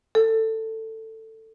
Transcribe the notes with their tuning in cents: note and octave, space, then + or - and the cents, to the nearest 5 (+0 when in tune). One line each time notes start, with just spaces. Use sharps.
A4 +15